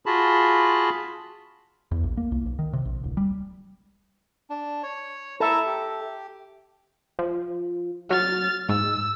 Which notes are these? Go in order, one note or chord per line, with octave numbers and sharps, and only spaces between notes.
F4 F#4 G#4 A5 B5
E2
A#1
A#3
C2
B1
D#3
C3
A#1
D1
G3
D4
C#5
E4 A4 E5 A5 A#5
G4
F3
F#3 F6 A6
G#2 E6